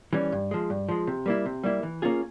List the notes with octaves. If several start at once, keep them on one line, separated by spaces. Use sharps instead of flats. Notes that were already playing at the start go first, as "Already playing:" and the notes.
E3 G3 C#4
G2
F3 G#3
G2
F3 G#3
C3
G3 A#3 E4
C3
G3 A#3 E4
E3
A#3 C#4 F4 G#4